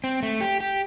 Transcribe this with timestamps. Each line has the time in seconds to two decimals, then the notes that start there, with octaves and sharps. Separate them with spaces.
0.04 C4
0.23 A3
0.41 G4
0.60 G4